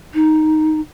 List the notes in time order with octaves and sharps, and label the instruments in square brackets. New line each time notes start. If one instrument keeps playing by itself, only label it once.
[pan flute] D#4